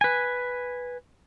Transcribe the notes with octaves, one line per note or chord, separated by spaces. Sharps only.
B4 G#5